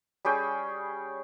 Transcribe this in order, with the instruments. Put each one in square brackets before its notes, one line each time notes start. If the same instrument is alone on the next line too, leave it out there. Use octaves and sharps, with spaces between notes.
[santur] G3 C#4 G#4 G5